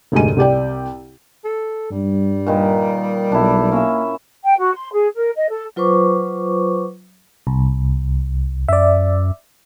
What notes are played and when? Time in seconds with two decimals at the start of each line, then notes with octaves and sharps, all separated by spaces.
0.12 F1 D2 G#2 G4 G#5 D#7
0.37 C2 G4 D5 G5
1.44 A4
1.91 G2 G3
2.47 A#2 D#3 B4
3.32 B1 D4 E4
3.72 A#3 C#4 E5
4.44 G5
4.58 F#4
4.75 C6
4.92 G#4
5.15 A#4
5.36 D#5
5.48 A4
5.76 F#3 F4 B4 C5 C#6 D6
7.47 C2
8.68 F#2 D5 E5